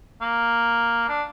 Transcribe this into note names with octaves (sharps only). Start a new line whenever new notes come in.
A#3
D4